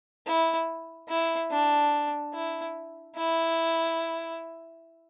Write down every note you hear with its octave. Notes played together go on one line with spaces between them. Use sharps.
E4
E4
D4
E4
E4